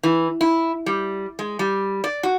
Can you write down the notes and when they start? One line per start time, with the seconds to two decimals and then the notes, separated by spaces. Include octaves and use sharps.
0.03 E3
0.41 E4
0.86 G3
1.39 G#3
1.59 G3
2.04 D5
2.23 F#4